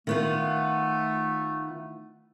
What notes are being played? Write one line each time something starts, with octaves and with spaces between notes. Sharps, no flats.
D#3 A3 B3 F4